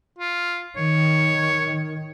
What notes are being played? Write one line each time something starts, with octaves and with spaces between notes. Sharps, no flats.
F4
D#3 C#5